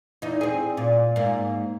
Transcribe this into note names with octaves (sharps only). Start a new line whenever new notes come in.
E2 D#4
C4 G#4
A#2
G#2 A#3